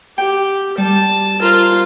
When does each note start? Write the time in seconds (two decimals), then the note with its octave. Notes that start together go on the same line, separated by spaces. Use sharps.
0.18 G4 G5
0.78 G3 A5
1.42 F4 A#4 C5